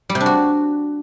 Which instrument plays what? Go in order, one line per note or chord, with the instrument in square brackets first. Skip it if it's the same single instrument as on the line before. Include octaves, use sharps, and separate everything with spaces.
[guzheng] G3
C3
D4
F#4